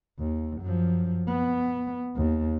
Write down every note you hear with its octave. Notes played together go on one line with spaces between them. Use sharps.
D#2
F#2 F3
B3
D#2